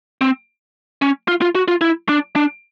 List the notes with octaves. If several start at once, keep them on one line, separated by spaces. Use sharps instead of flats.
C4
C#4
F4
F4
F#4
F4
E4
D4
D4